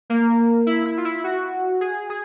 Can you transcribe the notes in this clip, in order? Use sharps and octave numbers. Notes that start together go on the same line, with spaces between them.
A#3
E4
E4
F4
E4
F#4
G#4
G#4